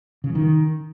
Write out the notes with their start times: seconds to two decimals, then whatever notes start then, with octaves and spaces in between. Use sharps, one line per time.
0.24 C#3
0.29 F3
0.35 D#3